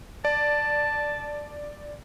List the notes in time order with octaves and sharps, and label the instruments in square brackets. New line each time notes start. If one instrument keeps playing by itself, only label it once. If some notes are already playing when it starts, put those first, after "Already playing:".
[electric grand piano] D5 [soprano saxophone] A5